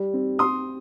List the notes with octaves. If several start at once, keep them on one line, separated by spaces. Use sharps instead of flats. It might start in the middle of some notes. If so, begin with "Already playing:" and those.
Already playing: G3
C4
C4 C6 D#6